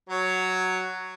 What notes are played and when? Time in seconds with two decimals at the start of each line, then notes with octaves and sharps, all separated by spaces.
0.09 F#3 C#5